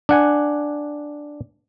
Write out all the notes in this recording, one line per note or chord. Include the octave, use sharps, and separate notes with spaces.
D4 F#5 G#5